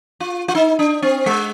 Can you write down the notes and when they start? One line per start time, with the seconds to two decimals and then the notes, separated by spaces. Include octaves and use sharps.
0.20 F4
0.48 F4
0.55 D#4
0.79 D4
1.02 C4
1.26 G#3